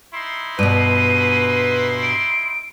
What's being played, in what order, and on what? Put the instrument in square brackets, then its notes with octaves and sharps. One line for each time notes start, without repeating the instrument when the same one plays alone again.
[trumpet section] D#4 E4 C6
[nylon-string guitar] G2 B2 [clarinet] B4 [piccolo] D#7
[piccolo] D7